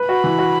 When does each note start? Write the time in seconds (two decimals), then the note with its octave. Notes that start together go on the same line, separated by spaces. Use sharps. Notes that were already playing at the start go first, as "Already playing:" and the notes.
Already playing: B4
0.08 F#4 B5
0.24 E3
0.39 F#4